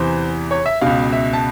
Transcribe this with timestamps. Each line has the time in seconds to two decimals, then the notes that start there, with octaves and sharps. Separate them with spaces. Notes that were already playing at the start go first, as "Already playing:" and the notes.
Already playing: E2 C3 E3 C5
0.51 C#5
0.66 E5
0.81 C#2 B2 F5
1.13 E5
1.33 A5